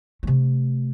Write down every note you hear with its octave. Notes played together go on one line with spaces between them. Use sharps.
C3 A3